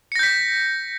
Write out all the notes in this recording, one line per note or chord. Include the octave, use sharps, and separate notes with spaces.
G6 A#6 B6 C#7